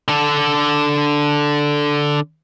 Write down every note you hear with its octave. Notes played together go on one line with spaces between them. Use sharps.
D3 A4